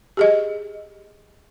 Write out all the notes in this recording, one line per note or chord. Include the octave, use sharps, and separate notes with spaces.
G4 G#4 D#5